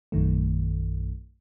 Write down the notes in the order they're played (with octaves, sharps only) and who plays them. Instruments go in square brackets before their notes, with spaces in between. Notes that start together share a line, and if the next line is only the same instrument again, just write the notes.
[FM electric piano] A#1 F#2 D#3 A3